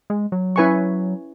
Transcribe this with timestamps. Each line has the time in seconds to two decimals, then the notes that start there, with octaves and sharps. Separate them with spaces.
0.10 G#3
0.32 F#3
0.56 C#4 E4 B4 G#5 C#6